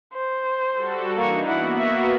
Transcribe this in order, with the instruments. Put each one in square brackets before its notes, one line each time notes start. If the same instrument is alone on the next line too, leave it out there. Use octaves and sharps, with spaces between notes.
[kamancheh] C5
[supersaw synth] G3 F#4 A4
[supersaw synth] E3 D4 D#4 [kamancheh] A#3 C#6
[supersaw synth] A#3 B3 F#4 [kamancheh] E4 F#5
[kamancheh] E5